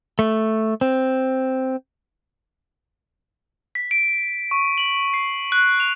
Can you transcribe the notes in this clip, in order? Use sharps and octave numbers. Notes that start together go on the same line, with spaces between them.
A3
C4
B6
D7
C#6
F#7
C7
F#6
F7